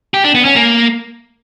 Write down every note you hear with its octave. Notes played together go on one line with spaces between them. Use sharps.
G4
D4
B3
C#4
A#3